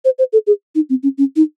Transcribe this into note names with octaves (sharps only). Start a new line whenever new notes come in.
C5
C5
A4
G#4
D#4
C4
C#4
C#4
D#4